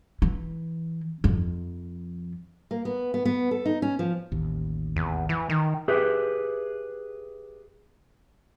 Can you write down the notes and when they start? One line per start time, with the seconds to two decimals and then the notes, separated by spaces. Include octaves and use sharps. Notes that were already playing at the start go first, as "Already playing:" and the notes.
0.22 E3
1.24 F2
2.71 A#3
2.85 B3
3.14 B3
3.25 B3
3.51 A4
3.65 D#4
3.82 C#4
3.99 F3
4.32 A1 D#2
4.96 E2
5.29 E3
5.50 D#3
5.88 G4 G#4 B4 E5